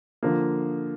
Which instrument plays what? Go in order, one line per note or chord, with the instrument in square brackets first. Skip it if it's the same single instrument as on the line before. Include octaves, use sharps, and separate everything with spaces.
[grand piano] D3 F3 A#3